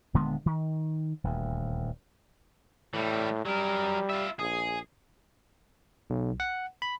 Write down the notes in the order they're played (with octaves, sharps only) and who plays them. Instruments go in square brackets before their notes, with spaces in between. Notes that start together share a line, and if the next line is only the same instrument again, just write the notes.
[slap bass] D#1 D3 G#3 B3
D#3
D#1 D2
[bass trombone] A2 [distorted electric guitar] E3 G3
[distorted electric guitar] F#3 A#4 [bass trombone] G3
[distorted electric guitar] F4 E5
[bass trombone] A#1 [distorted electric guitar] G#4
[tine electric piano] B1
F#5
B5